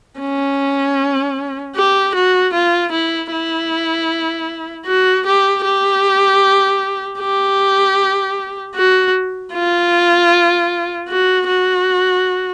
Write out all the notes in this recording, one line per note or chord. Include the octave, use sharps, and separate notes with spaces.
C#4
G4
F#4
F4
E4
E4
F#4
G4
G4
G4
F#4
F4
F#4
F#4